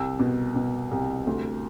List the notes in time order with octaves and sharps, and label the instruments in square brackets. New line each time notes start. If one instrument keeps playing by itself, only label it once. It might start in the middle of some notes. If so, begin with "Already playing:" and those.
Already playing: [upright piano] C2 E6
B2
B2
C2
D2